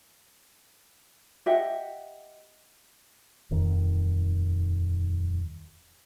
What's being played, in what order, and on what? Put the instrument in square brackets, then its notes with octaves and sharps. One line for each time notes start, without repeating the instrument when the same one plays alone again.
[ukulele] G4 D#5 E5 F#5
[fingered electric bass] D#1 F2 D#3